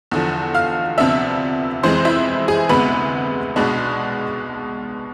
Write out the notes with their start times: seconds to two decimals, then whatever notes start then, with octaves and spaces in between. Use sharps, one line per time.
0.12 E2 D3 F3
0.55 F5 F6
0.98 D2 C3 F3 B3 D4 E5 E6
1.83 F2 E3 G#3 C4 C5 C6
2.05 E4 E5
2.48 G#4 G#5
2.69 D2 C3 G#3 B3 B4 B5
3.56 B1 B2 G#3 B3 D4